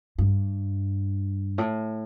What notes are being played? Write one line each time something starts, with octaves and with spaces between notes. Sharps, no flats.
G2
A2